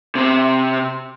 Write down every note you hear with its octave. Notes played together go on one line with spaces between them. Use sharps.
C3 C4